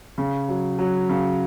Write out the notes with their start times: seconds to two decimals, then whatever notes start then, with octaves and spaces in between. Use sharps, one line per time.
0.18 C#3
0.48 F#3
0.79 F#3
1.09 C#3